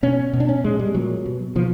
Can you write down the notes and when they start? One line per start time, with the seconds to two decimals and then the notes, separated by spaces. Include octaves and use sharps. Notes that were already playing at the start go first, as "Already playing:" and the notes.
0.03 B2 C#4
0.33 B2
0.40 D4
0.49 C#4
0.64 A#2 G#3
0.79 G3
0.95 A#2 F#3
1.26 B2
1.56 B2 F3